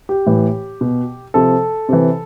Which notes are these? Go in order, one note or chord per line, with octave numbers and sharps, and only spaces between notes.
G4
A2 E3
B2
C3 F3 A4
C3 E3